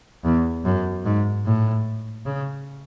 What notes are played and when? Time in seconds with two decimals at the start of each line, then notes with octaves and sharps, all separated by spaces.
0.25 E2
0.65 F#2
1.04 G#2
1.46 A2
2.26 C#3